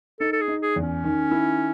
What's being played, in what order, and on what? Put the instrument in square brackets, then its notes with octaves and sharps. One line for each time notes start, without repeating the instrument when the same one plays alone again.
[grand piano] D#4 [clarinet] A4
[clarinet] A4
G#4
[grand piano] D#4
[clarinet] G#4
[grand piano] E2
[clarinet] C#4
[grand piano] D#3
E4